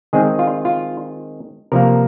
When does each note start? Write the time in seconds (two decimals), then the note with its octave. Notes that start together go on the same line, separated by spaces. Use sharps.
0.13 D#3 G#3 C4 G#4
0.39 F4
0.65 F4
1.72 C3 F3 A#3 A#4